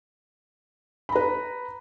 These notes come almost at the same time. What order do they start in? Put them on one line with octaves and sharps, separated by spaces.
B5 A#5 B4